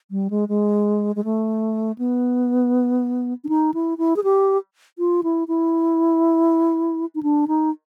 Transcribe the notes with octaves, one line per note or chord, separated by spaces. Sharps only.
G3
G#3
G#3
G#3
A3
B3
D4
D#4
E4
E4
G#4
G4
F4
E4
E4
D#4
D4
D#4